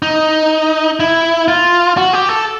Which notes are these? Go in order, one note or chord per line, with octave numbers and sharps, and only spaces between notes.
D#4
E4
F4
F#4
G4
A4